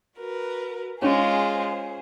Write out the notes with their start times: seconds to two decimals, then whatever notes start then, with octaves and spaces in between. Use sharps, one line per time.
0.18 F#4 A#4 B4
1.02 G#3 C#4 F4 G#4 C5